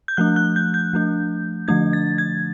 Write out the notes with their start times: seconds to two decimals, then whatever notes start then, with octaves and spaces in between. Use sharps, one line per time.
0.08 G6
0.17 F3 A3 D4 F#6
0.36 F#6
0.56 G6
0.74 G6
0.93 F3 A3 D4
1.68 D3 F3 A3 D4 G#6
1.93 A6
2.18 G#6